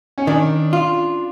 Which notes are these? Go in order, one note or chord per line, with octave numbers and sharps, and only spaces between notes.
C#4
D#3 D4
F4